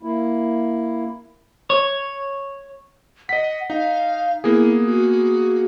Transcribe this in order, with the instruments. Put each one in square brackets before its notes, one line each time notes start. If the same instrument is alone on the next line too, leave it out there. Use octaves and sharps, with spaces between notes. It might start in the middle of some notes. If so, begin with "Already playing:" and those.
[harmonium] A#3 E4
[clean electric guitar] C#5
[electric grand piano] D#5 B6 [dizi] F#5
[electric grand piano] D#4 [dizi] F5
[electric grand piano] A#3 B3 G#4 [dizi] E4
[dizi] F#4